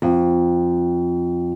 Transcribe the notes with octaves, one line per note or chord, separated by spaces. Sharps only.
F2